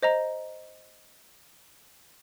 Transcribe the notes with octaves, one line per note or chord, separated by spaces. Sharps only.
C5 D#5 A#5